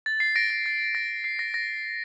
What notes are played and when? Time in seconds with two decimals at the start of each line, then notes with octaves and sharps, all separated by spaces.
0.06 A6
0.20 C7
0.36 A#6 D7
0.50 A#6
0.66 A6
0.95 A#6
1.24 C7
1.39 A#6
1.54 A#6